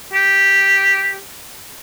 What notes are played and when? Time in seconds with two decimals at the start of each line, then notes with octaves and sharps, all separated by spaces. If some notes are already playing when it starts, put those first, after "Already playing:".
0.13 G4